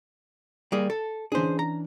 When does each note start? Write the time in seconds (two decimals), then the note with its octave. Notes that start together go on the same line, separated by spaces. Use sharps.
0.72 G3 A#3 G#4
0.90 A4
1.32 E3 C#4 D4 G#4 C5
1.59 A#5